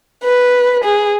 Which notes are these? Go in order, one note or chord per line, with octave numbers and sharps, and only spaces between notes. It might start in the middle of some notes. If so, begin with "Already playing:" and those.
B4
G#4